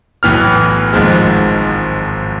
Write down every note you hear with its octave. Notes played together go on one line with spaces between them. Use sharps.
B1 A2 E3 B3 F6
G#1 G#2 F3 G#3